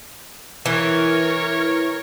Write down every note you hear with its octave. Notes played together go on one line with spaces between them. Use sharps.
E3 A#4 C#5